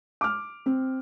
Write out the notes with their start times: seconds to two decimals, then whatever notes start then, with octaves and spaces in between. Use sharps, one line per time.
0.21 D6 F6
0.66 C4